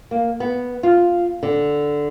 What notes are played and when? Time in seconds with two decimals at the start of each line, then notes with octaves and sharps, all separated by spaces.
0.11 A#3
0.40 B3
0.83 F4
1.43 D3